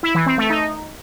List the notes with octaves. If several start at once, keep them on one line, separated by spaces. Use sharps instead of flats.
E4
E3
C4
A3
D#4